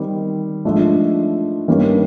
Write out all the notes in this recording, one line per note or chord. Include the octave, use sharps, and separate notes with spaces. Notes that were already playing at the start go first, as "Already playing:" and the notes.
Already playing: D#3 G3 C4
G#2 F3 A3 D4
G2 D#3 G3 A#3 C#4